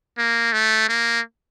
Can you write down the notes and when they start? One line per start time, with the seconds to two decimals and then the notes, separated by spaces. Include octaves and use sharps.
0.17 A#3
0.52 A3
0.89 A#3